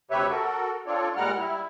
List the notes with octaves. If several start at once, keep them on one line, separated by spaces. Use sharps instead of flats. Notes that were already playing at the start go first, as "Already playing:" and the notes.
D2 C3 G4 B4 C#5 E5
F#4 A4 A#4
C4 D4 F4 A4 C#5 D5
A#2 G3 G#3 A#4 F#5 F6
G3 E4